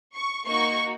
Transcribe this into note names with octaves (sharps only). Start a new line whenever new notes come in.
C#6
A#3 D#4 F#4 C#6